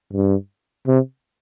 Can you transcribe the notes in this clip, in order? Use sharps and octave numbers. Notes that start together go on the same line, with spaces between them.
G2
C3